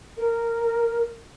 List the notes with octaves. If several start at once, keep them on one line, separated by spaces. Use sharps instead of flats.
A#4